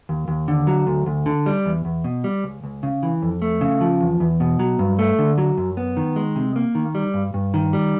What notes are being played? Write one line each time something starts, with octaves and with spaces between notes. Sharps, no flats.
D#2
D#2
D3
F#3
D2
D2
D3
G3
E2
E2
B2
G3
C#2
C#2
C#3
E3
F2
A3
C#3
F3
E2
E2
B2
F#3
G2
A3
D3
F#3
F#2
B3
D#3
G#3
C3
A#3
D#3
G3
G2
G2
D#3
G3